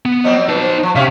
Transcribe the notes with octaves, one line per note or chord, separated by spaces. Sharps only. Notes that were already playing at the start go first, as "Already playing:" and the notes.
B3
F3 F#3 C4 D#5
D#4 B4 A5
C5
F3
C3 C4 C#4 G4 E5 F5